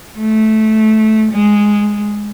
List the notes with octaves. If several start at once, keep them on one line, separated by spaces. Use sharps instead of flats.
A3
G#3